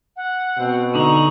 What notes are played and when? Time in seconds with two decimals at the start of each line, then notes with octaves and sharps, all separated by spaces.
0.16 F#5
0.57 B2 C4
0.95 D3 D#4 A#5 C#6 F#7